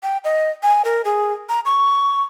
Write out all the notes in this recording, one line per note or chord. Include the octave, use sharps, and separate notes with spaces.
G5
D#5
G#5
A#4
G#4
A#5
C#6